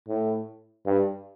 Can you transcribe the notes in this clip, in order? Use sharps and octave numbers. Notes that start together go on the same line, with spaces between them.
A2
G2